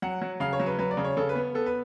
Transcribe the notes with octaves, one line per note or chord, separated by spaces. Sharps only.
F#3 F#5
F#3
C#3 F5
C#5
F#3
B4
F#3 B4
D5
C#3
C#5
C#3 A4
B4
B3
B3 A4
B4